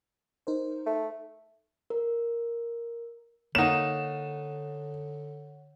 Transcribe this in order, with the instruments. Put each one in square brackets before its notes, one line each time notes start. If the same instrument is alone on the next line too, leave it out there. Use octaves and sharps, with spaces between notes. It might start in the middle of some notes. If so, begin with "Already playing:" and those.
[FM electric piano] D#4 A#4 C5
[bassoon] A3
[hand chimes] A#4
[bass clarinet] D3 [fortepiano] A#3 D#4 [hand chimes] C#5 F#5 [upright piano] E7